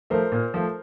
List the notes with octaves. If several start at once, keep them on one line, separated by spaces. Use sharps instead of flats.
F3 A3 A#4 C5
A#2
F3 A3